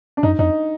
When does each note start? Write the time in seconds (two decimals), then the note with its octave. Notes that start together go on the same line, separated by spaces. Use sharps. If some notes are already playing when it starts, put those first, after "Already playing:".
0.17 D4
0.23 F#2 D#4
0.39 F2 D#4